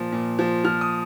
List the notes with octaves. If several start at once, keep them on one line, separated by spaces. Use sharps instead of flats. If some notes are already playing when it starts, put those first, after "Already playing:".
Already playing: A#2 F3
A#2
F3
F3 F6
D#6